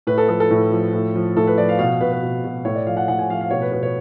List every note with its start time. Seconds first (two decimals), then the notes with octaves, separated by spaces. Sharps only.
0.07 A2 B4
0.18 A4
0.28 F3 A4
0.40 A4
0.51 A2
0.71 F3
0.93 A2
1.15 F3
1.36 A2 A4
1.47 B4
1.57 F3 D5
1.69 F5
1.79 B2 F5
2.01 B2 B4
2.12 B4
2.22 B2
2.44 B2
2.65 A2 C#5
2.75 D5
2.87 F3 F5
2.97 F#5
3.08 A2 F#5
3.19 G#5
3.29 F3 F5
3.41 F5
3.51 B2 C#5
3.62 B4
3.72 B2 B4
3.83 C#5